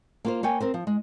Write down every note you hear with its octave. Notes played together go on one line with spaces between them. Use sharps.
A#3 F4 C5
A#3 C#5 G5 G#5
C4 A#4 C5
F3
G#3